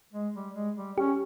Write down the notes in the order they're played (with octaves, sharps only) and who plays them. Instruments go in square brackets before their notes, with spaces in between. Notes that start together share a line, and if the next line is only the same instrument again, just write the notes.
[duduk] G#3
G3
G#3
G3
[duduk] C#4 [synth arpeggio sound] G4